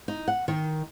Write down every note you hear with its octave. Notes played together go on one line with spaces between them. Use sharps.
D#4
F#5
D#3